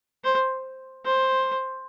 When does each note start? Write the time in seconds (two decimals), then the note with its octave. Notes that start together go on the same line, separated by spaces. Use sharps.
0.24 C5
1.05 C5